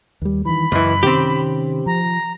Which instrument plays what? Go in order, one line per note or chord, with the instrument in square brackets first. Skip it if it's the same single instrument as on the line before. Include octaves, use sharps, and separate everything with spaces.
[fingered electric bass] D#2 G3
[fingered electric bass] D#3 E3 [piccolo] B5
[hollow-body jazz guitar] C#2 E3 [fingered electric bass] F#2
[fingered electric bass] C3 D#3 C#4 [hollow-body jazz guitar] C4 G4
[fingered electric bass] F3 [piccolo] A#5